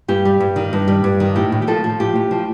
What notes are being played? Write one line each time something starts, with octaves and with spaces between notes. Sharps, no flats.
G2 G4
G3
G2
D#3
G2
G3
G2
D#3
A2 G4
A2
G4
F3 A4
F3
A2 G4
A2
F3